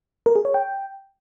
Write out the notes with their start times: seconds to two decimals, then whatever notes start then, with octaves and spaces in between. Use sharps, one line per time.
0.26 A#4
0.35 G#4
0.45 C#5
0.54 G5